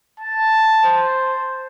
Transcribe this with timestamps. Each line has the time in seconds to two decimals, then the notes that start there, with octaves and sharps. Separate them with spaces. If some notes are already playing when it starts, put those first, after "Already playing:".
0.20 A5
0.84 C5